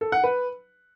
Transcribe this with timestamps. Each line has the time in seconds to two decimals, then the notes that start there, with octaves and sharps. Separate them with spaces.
0.01 A4
0.12 F#5
0.24 B4